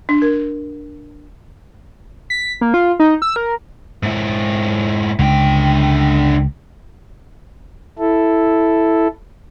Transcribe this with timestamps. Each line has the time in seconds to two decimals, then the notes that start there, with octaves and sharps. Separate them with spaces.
0.09 D4
0.22 A#4
2.30 B6
2.61 A#3
2.74 F4
3.00 D#4
3.22 E6
3.36 A#4
4.03 G#2 E4
5.19 C#2 D3 G5
7.99 E4 A4